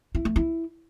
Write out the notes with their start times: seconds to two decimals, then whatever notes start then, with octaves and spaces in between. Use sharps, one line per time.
0.15 E4
0.25 A3
0.36 E4